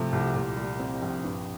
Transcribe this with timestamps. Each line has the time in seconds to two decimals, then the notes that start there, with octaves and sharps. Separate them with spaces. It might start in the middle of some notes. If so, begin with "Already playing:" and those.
Already playing: C3 F3 A3
0.12 C2
0.34 A#2
0.57 G3
0.79 C4
1.02 A#1
1.24 G2